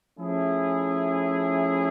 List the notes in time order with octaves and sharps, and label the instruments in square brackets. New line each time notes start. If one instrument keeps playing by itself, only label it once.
[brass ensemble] F3 A3 C#4 E4 G#4